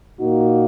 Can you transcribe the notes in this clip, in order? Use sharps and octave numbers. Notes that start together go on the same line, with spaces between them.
A#2 A#3 D#4 F#4